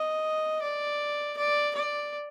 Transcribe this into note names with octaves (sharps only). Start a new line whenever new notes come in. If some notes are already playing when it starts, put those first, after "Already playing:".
Already playing: D#5
D5
D5
D5